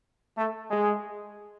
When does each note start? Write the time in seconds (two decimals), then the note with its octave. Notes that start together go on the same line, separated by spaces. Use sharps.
0.38 A3
0.71 G#3